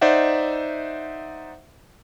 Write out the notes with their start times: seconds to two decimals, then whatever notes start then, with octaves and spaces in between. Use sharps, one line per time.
0.01 D#4 C5 D5 E5 F#5